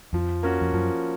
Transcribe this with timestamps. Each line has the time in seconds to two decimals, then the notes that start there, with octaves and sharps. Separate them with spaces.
0.13 F2 F3
0.43 A#3 C#4 F#4
0.61 F2
0.73 F#2 F3